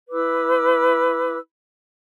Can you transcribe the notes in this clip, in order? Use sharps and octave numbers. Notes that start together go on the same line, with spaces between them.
E4 B4 D6 E6